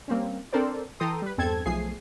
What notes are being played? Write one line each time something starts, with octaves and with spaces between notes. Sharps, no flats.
G3 A#3 C4 C#4
C4 D4 A4 A#4 C5 D5
E3 A4 G5 A#5 C6 D#6
G3 B4
E2 G2 C4 A4 A5 G#6
B1 F3 A3 G#4 G#5 C7